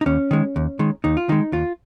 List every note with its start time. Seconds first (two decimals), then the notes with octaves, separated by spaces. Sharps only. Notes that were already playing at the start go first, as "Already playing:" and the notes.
0.01 D#4
0.06 D#2 C#4
0.31 D#3 G#3
0.56 D#2
0.79 D#3 G#3
1.04 D#2 D#4
1.17 F4
1.29 D#3 G#3 D#4
1.52 D#2 F4